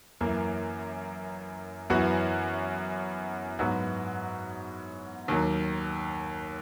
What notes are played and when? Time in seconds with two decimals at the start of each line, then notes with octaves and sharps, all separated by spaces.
0.21 F#2 E3 A#3
1.90 F#2 E3 B3 F#4
3.59 G#2 F#3 B3 F#4
5.28 D#2 D#3 F#3